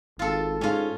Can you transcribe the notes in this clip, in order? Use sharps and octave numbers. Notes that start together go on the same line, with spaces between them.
G#1 F4 A4
G#2 C#4 F4